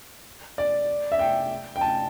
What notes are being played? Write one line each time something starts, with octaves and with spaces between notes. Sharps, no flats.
D5
E5
G5
G5
A5